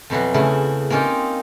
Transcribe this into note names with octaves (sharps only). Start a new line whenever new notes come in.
F2 B2 E3 F#3
E2 C#3 A3 E4
A#3 C4 C#4 D#4 F4 G4